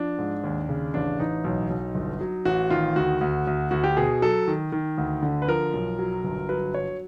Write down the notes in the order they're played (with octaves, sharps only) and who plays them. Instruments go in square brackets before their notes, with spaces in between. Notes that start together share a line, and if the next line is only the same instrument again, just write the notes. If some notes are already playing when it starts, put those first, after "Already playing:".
Already playing: [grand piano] F3 D4
G#2
D#2
C#3
A1 D4
A1 D#4
B1
B1
G1
F#3
A1 F#4
D#3 F4
D2 F#4
D2
D2
D2 F#4
G4
B2 G#4
F#3 A4
D#3
D#3
D2
D3
B4
F3 A#4
B1
F#3
G1
F#3 B4
F#3 C#5